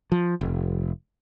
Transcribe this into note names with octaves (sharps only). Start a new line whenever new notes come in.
F3
F1